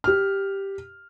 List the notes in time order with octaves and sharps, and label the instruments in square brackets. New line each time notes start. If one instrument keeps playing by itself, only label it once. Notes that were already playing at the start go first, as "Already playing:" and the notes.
[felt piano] G4 F6